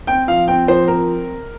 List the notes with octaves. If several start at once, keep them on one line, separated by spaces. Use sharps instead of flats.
C4 G5
F3 F5
C4 G5
F3 C5
C4 A#4